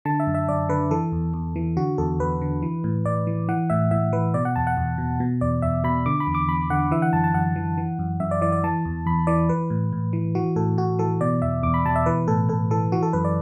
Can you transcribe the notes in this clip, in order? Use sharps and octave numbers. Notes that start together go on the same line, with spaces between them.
D3 A5
E5
F#2
E5
F#2 D5
D3 B4
E3 A4
E2
E2
E3
D3 F#4
E2 A4
E2 B4
D3
E3
A2
A2 D5
E3
E3 F#5
A2 E5
A2 E5
E3 B4
B2 D5
F#5
E2 A5
F#5
E2
B2
B2
E2 D5
E2 E5
B2 B5
D3 D6
B5
E2
D6
E2 B5
D3 F#5
E3 E5
F#5
F#2 A5
A5
F#2 F#5
E3
E3
F#2
F#2 E5
D5
E3 D5
D5
E3 A5
E2
E2 B5
E3 D5
E3 B4
A2
A2
E3
E3 F#4
A2 A4
A2 F#4
E3 A4
B2 D5
E2 E5
E2 D6
B5
B2 A5
E5
E3 B4
A2 A4
A2 A4
E3 A4
E3 F#4
A4
F#2 B4
D5